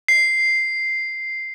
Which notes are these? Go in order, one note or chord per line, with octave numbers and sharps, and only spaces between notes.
C7